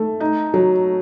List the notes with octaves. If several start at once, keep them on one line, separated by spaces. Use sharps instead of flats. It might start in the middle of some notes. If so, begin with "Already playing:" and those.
Already playing: A3
D#4
F#3